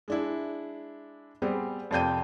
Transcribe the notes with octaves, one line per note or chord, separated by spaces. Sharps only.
G#3 D4 E4
G3 B3 C4 G#4
F2 C3 D5 G5 G6 D#7